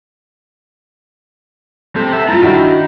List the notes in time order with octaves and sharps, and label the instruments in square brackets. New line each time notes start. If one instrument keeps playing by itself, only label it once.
[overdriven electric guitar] C4 G4 [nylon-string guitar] A4
[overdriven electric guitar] B3 E5
[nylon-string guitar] E4 F4 [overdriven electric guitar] A4 A#5
[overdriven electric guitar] D#3 [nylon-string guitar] D4 E4 F#4